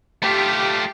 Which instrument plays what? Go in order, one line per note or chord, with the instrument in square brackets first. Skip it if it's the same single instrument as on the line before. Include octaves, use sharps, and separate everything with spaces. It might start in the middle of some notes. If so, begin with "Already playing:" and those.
[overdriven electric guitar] A3 F4 [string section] G4